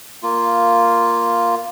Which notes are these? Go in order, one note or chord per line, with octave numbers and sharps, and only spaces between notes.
A#3 F4